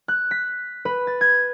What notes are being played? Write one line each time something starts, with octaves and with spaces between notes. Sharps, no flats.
F#6
B6
B4
A6
G#6